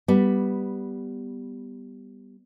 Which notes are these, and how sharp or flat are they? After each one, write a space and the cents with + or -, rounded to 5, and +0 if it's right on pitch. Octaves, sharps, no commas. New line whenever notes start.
G3 +0 B3 +0